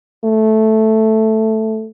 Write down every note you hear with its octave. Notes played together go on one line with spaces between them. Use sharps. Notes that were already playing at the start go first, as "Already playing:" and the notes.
A3